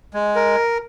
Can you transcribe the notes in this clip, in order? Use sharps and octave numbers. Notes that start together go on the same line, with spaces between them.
G#3
A#4